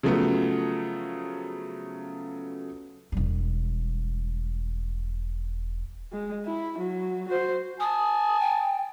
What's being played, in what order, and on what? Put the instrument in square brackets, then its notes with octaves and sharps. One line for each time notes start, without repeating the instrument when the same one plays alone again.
[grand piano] C#3 F3 F#3 A3 B3
[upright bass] E1 G3
[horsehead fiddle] G#3
E4
F#3
F#4 C5
[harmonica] G#5 A5 [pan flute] D#6
[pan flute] G5